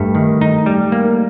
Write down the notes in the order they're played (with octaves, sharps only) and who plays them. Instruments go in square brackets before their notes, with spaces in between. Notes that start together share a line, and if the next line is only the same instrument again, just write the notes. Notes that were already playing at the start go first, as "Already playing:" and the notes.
Already playing: [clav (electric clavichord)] G2 [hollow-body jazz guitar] A3
[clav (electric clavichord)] D#3
D#4
G3
A#3